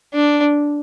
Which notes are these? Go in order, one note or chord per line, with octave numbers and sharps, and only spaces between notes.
D4